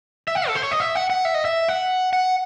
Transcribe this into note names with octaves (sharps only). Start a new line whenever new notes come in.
E5
F#5
A4
C5
C#5
D#5
E5
F#5
F#5
E5
D#5
E5
F#5
F#5